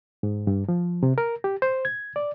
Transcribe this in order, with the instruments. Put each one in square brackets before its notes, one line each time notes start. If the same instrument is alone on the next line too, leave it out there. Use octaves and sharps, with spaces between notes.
[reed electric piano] G#2
G2
F3
C3
A#4
G4
C5
G#6
D5